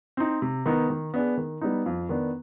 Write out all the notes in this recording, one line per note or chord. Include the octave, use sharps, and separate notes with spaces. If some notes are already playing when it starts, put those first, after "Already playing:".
C4 D#4
C3
D#3 B3 D#4
D#3
B3 D4 G#4
D#3
G3 B3 D#4
F2
D#3 B3 D4